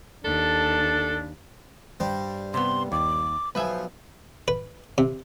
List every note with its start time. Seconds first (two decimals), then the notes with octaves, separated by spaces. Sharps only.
0.25 D#2 D4 A4
2.00 G2 G3 C5
2.54 C3 B3 C6
2.92 D#2 D6
3.55 B1 F3 B4 C5 E5 G#5
4.48 B4
4.98 C3